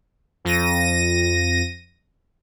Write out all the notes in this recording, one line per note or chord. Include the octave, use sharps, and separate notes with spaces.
F2 A#6 D#7